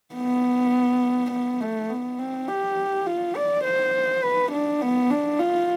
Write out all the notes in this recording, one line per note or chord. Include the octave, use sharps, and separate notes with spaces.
B3
B3
A3
B3
C4
G4
F4
D5
C5
B4
D4
B3
D4
F4